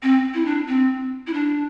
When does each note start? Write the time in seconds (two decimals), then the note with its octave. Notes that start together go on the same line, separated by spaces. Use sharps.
0.03 C4
0.34 E4
0.45 D4
0.68 C4
1.27 E4
1.33 D4